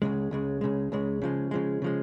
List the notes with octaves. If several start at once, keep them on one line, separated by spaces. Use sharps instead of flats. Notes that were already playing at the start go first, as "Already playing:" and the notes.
C#2 C#3 G#3
C#2 C#3 G#3
C#2 C#3 G#3
C#2 C#3 G#3
C#3 F3 G#3
C#3 F3 G#3
C#3 F3 G#3